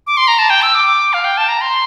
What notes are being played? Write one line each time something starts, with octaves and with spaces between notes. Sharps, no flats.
D6
C6
A#5
A5
G5
E6
D6
F5
G5
A5
A#5
C6